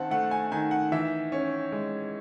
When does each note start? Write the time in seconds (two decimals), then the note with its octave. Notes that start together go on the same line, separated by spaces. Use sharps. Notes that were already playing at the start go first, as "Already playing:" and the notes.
Already playing: D#3 C4 F#5 A5
0.11 A3 F#5
0.31 G#5
0.52 D#3 G#5
0.71 F#5
0.92 E3 E5
1.32 C#4
1.72 G#3